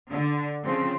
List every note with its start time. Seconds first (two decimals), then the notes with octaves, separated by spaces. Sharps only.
0.10 D3
0.63 C#3 F3 C4